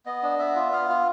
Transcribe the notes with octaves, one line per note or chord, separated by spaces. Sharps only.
B3 D#5
D4
B3 E5
F4
B3 F5
F4